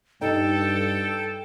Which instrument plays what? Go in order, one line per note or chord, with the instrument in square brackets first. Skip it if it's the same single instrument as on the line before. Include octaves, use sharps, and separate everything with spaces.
[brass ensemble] G2 [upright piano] D#4 [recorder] A4 [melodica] G5